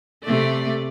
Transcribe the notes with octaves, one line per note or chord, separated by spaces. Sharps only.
C3 A3 D5